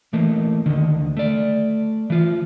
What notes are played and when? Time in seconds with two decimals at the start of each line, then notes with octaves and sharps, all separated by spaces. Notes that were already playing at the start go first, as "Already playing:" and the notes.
0.13 E3 A3 A#3
0.66 D2 D3 D#3
1.17 A3 D5
2.10 E3 F4